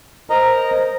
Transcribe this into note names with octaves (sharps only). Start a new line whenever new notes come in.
A#4 C5 D#5 A#5